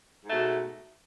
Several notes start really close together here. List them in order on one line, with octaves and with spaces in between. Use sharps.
G#2 A3 B2